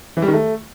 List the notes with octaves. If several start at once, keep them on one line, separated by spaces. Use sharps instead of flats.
E3
G3
D#3
A3